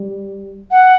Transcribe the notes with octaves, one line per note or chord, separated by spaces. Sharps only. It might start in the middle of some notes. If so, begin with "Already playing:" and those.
Already playing: G3
F#5